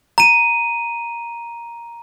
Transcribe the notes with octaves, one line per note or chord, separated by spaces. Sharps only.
A#5 D#7